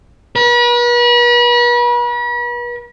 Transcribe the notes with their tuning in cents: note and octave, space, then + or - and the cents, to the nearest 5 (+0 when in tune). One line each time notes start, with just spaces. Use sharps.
B4 -40